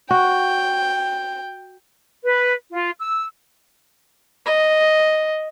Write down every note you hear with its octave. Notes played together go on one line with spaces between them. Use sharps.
F#4 G5
B4
F4
E6
D#5